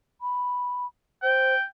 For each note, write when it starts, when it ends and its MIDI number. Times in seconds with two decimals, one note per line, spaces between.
0.21 0.85 83
1.22 1.53 72
1.22 1.63 79